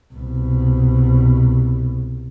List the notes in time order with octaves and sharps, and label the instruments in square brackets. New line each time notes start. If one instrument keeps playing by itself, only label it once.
[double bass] C2 B2